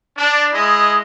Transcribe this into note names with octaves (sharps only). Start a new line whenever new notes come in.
D4
G#3 E4 D#5